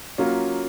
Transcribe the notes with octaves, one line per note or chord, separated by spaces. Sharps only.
F#3 A#3 C#4 F4